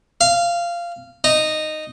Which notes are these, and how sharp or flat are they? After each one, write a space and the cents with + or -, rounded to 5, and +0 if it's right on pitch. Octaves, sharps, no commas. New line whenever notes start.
F5 -15
D#4 -10